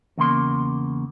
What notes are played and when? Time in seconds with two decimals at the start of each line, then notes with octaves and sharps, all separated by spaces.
0.18 E2 C#3 A#3 C6